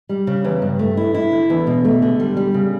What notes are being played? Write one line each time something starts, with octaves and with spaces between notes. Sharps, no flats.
G3
C#3
E2
G2
A3
E4
E4
D3
E2
B2
A3
D3
G3
G3
C#3